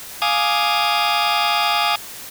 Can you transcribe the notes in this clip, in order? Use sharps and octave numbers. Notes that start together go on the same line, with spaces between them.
F5 G#5 D6 D#6